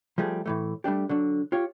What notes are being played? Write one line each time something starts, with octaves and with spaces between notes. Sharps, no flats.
F3 G3 A3 G#4
A2 E3 A3
G3 A3 D4 G4
D3 F#3 D4
F4 G4 C#5